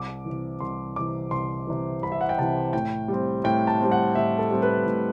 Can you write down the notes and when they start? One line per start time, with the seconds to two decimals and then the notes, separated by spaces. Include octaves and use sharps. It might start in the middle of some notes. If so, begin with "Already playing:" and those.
Already playing: C2 D6
0.25 C3 E3
0.60 C2 C6
0.96 C3 E3 D6
1.31 C2 C6
1.67 C3 E3
2.02 C2 B5
2.12 E5
2.21 F#5
2.29 G5
2.38 C3 E3 A5
2.73 A2 G5
3.08 G3 C4
3.44 A2 G5
3.67 A5
3.80 G3 C4
3.92 F#5
4.15 A2 E5
4.38 A4
4.50 G3 C4
4.62 B4
4.85 A2